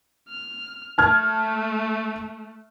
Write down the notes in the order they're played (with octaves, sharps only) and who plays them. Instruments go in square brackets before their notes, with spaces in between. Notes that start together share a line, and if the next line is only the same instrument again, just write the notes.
[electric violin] F6
[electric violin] A3 [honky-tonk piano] A5 F6 G#6